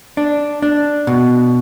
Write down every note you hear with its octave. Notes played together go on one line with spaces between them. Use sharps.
D4
D4
B2